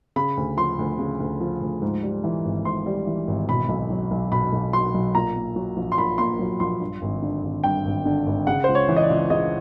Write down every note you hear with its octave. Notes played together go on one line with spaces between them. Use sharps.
C#3 B5
D2
F3 C6
D2
C#3
D2
F3
D2
G#2
G3
E3
G#1
G#2 C6
G3
E3
G#1
B2 B5
B1
F#3
B1
B2 B5
B1
F#3 C6
B1
A#2 A#5
A#3
F#3
A#1
C6
A#2 B5
A#3 C6
F#3
A#1 C6
G2
G#1
D3
G#1
G2 G5
G#1
D3
G#1
C#3 F#5
C#2 C5
C#5
E3
D#5
D5
C#2
C#3 D#5